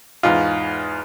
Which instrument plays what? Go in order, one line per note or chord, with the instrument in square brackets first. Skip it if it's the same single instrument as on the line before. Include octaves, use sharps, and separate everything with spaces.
[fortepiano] E2 G#2 F4